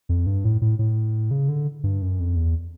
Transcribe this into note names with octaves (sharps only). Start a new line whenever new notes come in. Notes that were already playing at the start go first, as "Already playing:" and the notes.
F2
G2
A2
A2
A2
C#3
D3
G2
F#2
F2
E2